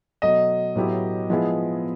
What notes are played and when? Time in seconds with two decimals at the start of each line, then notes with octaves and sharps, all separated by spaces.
0.22 B2 F#3 A3 D#5
0.75 A2 F#3 B3 E4 G4
1.30 F3 G#3 B3 E4 G#4